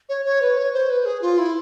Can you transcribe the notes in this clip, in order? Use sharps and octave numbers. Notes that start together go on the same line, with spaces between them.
C#5
C#5
B4
C#5
C5
B4
G#4
F4
E4